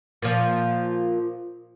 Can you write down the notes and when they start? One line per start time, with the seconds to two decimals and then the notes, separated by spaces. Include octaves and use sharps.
0.22 A#2 F3